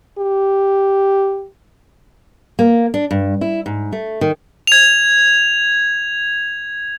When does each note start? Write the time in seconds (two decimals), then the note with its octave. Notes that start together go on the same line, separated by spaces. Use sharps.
0.19 G4
2.59 A#3
2.94 D4
3.11 G2
3.41 E4
3.66 G#2
3.93 A3
4.21 D#3
4.67 G#6 F7